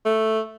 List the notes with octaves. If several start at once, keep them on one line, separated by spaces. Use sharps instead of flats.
A3